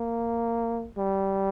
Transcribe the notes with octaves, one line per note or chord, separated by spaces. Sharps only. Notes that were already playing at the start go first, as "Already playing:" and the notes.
Already playing: A#3
G3